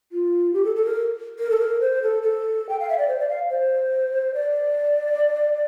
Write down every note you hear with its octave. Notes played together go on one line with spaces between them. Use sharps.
F4
G4
A4
A4
A#4
A#4
A4
A#4
C5
A4
A4
G5
F5
E5
D5
C5
D5
F5
C5
D5